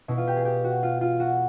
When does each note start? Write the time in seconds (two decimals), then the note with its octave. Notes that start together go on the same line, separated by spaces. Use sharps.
0.08 B2 E4
0.17 F4
0.28 G4
0.36 G#4
0.45 G4
0.64 F#4
0.83 F4
1.01 F4
1.20 F#4